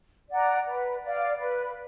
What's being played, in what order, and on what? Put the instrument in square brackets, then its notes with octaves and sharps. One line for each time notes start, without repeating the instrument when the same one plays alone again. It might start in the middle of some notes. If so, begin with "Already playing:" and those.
[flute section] D5 F#5 A#5
B4
D5 F5
B4